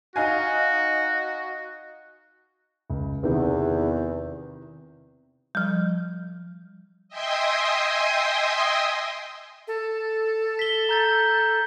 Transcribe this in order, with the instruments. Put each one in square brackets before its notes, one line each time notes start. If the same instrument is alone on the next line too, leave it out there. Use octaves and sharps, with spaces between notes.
[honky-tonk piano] D#4 F5 G#5 [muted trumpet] F#4
[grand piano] C#2
[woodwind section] E2 [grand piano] C3 D#3
[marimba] F3 G3
[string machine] D#5 E5 G5 G#5 C6 D#6
[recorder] A4
[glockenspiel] B6 G7
A#5 G6 A6